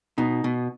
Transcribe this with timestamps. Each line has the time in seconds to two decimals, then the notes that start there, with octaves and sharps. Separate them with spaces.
0.18 B2 D#4
0.44 B2